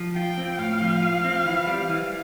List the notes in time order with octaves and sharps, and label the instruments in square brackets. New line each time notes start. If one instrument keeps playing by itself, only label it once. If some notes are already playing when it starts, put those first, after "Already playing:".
Already playing: [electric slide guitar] F3
[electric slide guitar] F4 [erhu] G5
[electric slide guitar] C4
[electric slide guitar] A2 [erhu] F5
[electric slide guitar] F3
F4
C4
E3
G3
E3